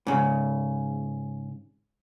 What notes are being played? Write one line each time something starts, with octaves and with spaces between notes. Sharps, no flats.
G#2 C#3